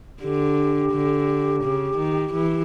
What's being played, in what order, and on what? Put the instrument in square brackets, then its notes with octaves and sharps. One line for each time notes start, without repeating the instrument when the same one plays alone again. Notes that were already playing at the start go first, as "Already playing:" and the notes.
[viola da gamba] D3 [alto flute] G4
[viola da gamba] D3
C#3
D#3
E3